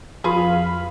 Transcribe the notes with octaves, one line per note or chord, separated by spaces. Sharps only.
F2 F4 G#4 B4 F5 B5